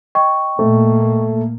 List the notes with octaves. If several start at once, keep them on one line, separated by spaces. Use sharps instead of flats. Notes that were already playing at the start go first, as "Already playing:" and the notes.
D#5 G5 C#6
A#2 A3 A#3